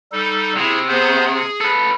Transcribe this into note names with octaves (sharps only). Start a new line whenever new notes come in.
G3 D#4 A4
C3 E4 G#4
B3 G#4 C5
G#4
A4 B4